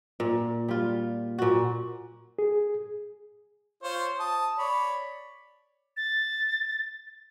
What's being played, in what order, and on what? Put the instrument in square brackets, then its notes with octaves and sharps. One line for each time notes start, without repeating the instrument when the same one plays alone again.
[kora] A#2
G3 F4
A#2 F#4
[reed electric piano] G#4
[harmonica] F4 C5 C#5
A5 D#6
C#5 D5 B5
[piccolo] A6